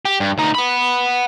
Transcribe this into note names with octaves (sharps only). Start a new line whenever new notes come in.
G4
G2
D2 D#4
F#5 B5